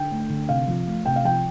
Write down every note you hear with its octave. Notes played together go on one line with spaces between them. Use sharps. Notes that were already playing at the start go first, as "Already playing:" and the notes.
Already playing: D3 G5
A3
D3
C3 F5
F3
A3
C3 G5
F5
F3 G5